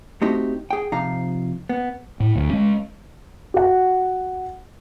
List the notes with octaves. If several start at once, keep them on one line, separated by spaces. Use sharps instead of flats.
A3 C4 D#4 F#4 G4 E5
G#4 G5
C3 F3 D#4 F5 A#5
B3
A2
D2
G#3 C#4
F#4 F#5